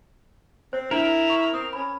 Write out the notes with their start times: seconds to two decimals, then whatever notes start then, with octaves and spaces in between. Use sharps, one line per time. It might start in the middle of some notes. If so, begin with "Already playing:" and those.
0.73 C4 C5
0.91 D4 E4 A#4 F#7
1.30 C#6
1.54 C4 D#6
1.73 C#4 B5